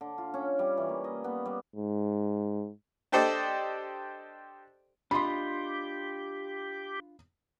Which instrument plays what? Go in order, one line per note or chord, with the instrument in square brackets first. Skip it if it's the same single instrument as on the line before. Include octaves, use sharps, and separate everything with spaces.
[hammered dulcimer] D3
F4
C#4
G3
E3
A#3
D#5
B3
G3
[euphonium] G#2
[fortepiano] D4 G4 A4 C5 D5 D#5
[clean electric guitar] D4 F4 D#5 [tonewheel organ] G4 [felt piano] B5 C6